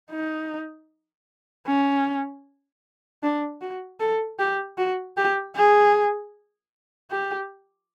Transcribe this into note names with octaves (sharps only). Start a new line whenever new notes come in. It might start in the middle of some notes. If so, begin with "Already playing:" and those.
D#4
C#4
D4
F#4
A4
G4
F#4
G4
G#4
G4